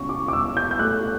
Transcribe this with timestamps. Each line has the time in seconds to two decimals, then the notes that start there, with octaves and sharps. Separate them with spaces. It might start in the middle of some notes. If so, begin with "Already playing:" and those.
Already playing: C#2 B2 C#4 C#6
0.09 D6
0.28 D6
0.32 B2 E6
0.57 G6
0.71 G6
0.79 A3 F#6